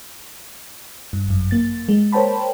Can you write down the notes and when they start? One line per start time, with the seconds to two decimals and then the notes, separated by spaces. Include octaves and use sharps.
1.13 G2
1.27 G#1 F#2
1.51 A#3 A6
1.89 G#3
2.13 A#4 C5 C#5 G5 A5 B5